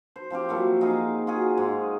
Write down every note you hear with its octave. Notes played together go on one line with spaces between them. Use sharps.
C5
F3 C4 F4 G4
A#2 F3 F#3 E4
D#4 F4 G#4 F5
F4 F#4 G#4
G#2